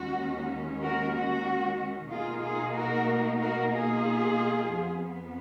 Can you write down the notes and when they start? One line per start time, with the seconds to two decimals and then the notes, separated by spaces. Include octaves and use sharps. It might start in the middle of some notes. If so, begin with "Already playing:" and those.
Already playing: D#2 D#3 G#3 C#4 F#4
0.82 F#4 A#4
1.13 F#4
2.11 B2 A#3 D#4 F4 G#4
2.43 F4 G#4
2.76 F#4 A#4
3.40 F#4 A#4
3.72 F4 G#4
4.69 F2 F3 B3